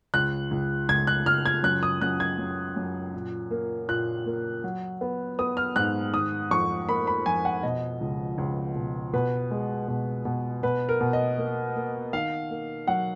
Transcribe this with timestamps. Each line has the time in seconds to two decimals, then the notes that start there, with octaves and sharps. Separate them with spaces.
0.14 C#2 F#6
0.51 C#2
0.89 C#2 G#6
1.07 F#6
1.26 C#2 F6
1.46 G#6
1.63 F#2 F#6
1.83 D#6
2.01 F#2 F#6
2.20 G#6
2.39 F#2
2.76 F#2
3.14 A#2
3.51 A#3
3.88 A#2 F#6
4.26 A#3
4.64 F#3
5.01 B3
5.39 B3 D#6
5.57 F6
5.76 G#2 F#6
6.13 D#3 D#6
6.51 F2 C#6
6.88 A#3 B5
7.07 B5
7.26 F2 G#5
7.45 F#5
7.63 B2 D#5
8.01 C#2
8.38 C#2
8.76 B2
9.13 B2 B4
9.51 G#3
9.88 B2
10.25 B2
10.63 B2 B4
10.89 A#4
11.01 B2
11.13 D#5
11.38 A#3
11.75 A#3
12.13 D#3 F5
12.50 A#3
12.87 F#3 F#5